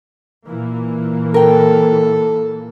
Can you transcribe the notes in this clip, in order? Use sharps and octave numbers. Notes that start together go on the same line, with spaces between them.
A#2 E3 A#3
A4 A#4 G5